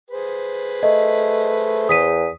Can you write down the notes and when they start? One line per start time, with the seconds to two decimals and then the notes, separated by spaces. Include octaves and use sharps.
0.11 G#4 B4 C5
0.83 A3 D#5
1.89 E2 D#6 B6 D#7